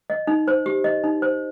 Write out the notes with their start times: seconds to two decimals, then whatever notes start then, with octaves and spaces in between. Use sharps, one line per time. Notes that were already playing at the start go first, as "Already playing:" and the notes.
0.10 D#5
0.27 D#4
0.48 C5
0.66 G4
0.84 D#5
1.04 D#4
1.22 C5